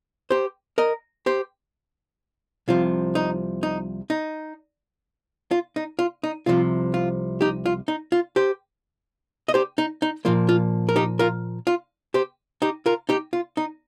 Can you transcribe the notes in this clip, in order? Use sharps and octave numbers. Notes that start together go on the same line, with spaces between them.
G4 C5
A#4 D#5
G4 C5
C2 C3 F3 F4
D#4
D#4
D#4
F4
D#4
F4
D#4
C2 C3 F3 F4
F4
D#4 G4
F4
D#4
F4
G4 C5
D#5
G4 C5
D#4
D#4
A#2 F3 A#3 F4
F4
A#4
D#4 G4
F4 A#4
F4
G4 C5
D#4 G4
F4 A#4
D#4 G4
F4
D#4